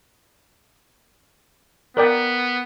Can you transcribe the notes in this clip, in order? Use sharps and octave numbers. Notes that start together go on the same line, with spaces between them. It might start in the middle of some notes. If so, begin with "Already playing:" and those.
B3 A#4 D5 G5